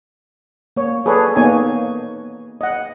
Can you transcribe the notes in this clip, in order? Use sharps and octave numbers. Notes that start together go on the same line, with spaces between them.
A#3 C#5
G#4 A4 B4 C#5 D5
A#3 B3 D#4 C#5 G#5
D#5 F#5